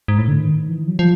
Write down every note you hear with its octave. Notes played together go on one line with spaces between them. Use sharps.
G#2
A2
D3
D#3
E3
F#3
F3